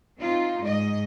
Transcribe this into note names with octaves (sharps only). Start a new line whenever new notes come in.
C4 D#4 F4
G#2 D#5